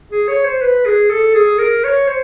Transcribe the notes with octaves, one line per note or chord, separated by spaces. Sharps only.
G#4
C#5
C5
B4
G#4
A4
G#4
A#4
C#5
C5